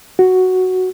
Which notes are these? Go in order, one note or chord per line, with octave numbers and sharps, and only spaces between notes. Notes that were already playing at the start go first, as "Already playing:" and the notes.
F#4